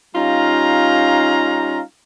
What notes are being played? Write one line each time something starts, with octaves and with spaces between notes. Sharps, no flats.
G3 C#4 D#4 F4 F5 A#5